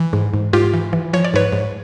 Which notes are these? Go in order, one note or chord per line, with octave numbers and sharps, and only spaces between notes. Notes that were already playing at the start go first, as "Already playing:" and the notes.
Already playing: E3
G#2
G#2
G#2 F4 G4
E3
E3
F3 C#5
D5
G#2 B4 C#5
G#2